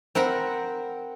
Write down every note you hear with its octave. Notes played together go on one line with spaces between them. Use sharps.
C4 A#4 F#5 B5